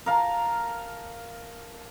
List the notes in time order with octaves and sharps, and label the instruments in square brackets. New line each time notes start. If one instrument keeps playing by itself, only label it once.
[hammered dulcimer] A#4 F5 A5